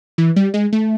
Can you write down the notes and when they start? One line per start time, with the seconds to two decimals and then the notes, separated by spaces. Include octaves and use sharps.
0.18 E3
0.36 G3
0.54 G#3
0.73 A3